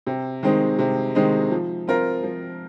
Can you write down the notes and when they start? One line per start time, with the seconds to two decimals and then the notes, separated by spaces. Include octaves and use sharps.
0.07 C3
0.43 D#3 G#3 C4 D#4
0.79 C3
1.15 D#3 G#3 C4 D#4
1.51 F3
1.88 C4 F4 A#4
2.23 F3